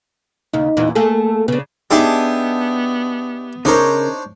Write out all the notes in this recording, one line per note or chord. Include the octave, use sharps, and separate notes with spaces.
D#2 C#3 D#4
E2 A#2 E3
A3 A#3 G#4 A4
C#3 B3 D4
B3 D4 D#4 G4 G#4 E5 A5
C#3 D4 D#4 A#4 C5 C#5